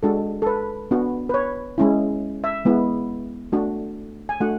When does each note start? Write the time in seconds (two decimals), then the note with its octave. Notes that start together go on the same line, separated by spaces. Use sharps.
0.03 G#3 D4 F#4 A4
0.42 A4
0.47 B4
0.91 B3 D4 F#4
1.29 B4
1.34 C#5
1.78 G#3 C#4 E4
2.44 E5
2.65 G#3 B3 E4
3.52 A3 D4 F#4
4.29 G#5
4.41 A3 D4 F#4 F#5